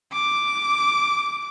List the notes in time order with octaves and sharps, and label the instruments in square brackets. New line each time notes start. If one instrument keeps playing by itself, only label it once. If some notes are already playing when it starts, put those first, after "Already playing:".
[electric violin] D6